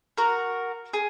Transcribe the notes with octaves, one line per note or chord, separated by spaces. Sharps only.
F#4 A#4
G#4